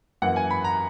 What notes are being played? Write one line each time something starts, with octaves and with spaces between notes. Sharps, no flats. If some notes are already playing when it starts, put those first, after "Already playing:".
F#2 E3 A#3 F#5
G#5
B5
A#5